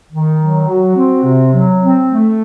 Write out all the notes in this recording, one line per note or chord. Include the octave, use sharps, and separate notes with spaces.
D#3
F#3
F#4
C4
C3
F#3
C4
A3